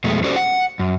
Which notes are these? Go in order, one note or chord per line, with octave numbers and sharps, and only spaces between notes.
F2 B2 G#3 A3
C#4 F#4 G4 A4 C5 D5
F#5
F#2